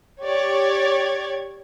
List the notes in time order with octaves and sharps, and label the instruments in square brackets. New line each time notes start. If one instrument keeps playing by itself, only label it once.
[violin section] G4 C#5 D5 G#6